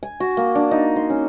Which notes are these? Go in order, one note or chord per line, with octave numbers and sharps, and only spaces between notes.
G#5
F#4
A#3
D4
D#4
C6
C#4